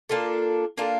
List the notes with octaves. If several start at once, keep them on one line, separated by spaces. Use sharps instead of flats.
A#3 D4 F4 A4
A#3 D4 F4 A4